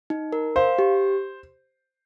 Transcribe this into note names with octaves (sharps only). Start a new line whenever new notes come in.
D#4
A#4
C5 F5
G4